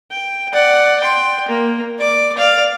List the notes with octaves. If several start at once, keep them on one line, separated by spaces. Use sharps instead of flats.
G5
D5 F#5
G5 C6
A#3
D5 D6
D5 F5